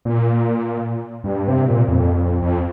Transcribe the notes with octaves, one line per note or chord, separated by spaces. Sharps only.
A#2
G2
C3
A#2
F2
F2